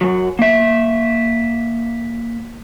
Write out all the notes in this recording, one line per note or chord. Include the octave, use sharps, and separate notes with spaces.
F#2 F#3
A#3 E5